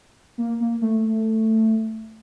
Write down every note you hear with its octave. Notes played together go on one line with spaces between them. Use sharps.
A#3
A#3
A3